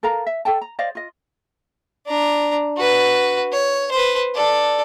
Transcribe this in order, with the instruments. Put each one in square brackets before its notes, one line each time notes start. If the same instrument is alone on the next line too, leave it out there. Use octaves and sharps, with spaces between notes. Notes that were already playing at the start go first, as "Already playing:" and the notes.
[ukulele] A4 A#4 F5 A#5
E5
A4 D5 G5 A5
A#5
C5 D5 D#5 F5
F4 D#5
[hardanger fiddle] D4 A#5
F#4 B4
C#5
B4 C5
A4 D5